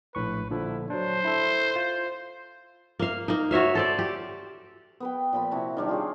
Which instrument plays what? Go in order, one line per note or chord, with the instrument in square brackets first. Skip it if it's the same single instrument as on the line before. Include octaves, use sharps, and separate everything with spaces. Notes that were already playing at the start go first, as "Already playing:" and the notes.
[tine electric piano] A#1 A2 C#6 [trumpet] B4
[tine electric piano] A#2 D3 F3 [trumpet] E4
[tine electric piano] F#3 D4 [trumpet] C5
[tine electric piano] E4 A4
F4
[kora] A#3 F5
A#3 D#4
F#4 C#5 E5 F5
A4 C5 D5
G4
[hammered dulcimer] B3 B4 G5
A#2 F3 B5
C3 E4 F#4 A5
D#3 G3 D4
F4 G#4 C#5